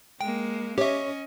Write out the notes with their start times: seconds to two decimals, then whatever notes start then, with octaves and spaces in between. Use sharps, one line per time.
0.21 G#3 A#3 G5
0.78 C#4 G4 C#5 D#5 E5